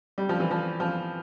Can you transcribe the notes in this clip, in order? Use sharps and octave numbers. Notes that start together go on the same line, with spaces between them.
G3
F3
E3
F3
F3